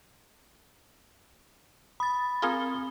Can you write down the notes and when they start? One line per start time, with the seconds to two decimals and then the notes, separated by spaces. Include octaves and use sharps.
2.00 B5 D#6 A6
2.42 C4 F4 G#4 A#4 G7